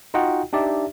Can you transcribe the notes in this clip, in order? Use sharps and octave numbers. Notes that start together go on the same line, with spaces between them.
D#4 F4 F#4 D#5 F#5 G5
D4 D#4 G4 D5 E5